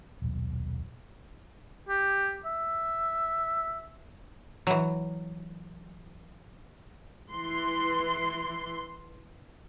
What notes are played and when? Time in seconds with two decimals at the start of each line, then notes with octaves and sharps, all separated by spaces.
0.22 D#1 B1
1.89 G4
2.46 E5
4.67 E3 F#3
7.32 E3 C6